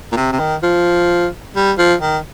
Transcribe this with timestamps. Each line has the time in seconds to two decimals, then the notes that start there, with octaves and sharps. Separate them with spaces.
0.12 A#2
0.16 C3
0.32 C3
0.39 D#3
0.63 F3
1.56 G3
1.78 F3
2.02 D#3